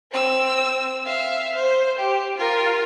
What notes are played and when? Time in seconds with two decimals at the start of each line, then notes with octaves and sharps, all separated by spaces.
0.12 C4 E6
1.06 E5 F5
1.56 C5
1.99 G4
2.38 F4 A#4